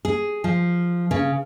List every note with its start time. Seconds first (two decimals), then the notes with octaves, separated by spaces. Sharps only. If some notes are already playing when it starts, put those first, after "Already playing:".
0.05 G#4
0.44 F3
1.11 C#3